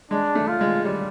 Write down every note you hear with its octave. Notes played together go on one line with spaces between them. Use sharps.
G#3 D4
A3
F4
G#3
G3